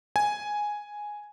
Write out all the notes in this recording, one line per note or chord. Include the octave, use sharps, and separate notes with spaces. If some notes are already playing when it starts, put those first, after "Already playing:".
G#5